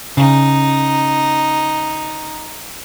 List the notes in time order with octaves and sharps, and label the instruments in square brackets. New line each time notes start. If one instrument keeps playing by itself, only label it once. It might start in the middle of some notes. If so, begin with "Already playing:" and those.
[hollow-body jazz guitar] C#3 [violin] D#4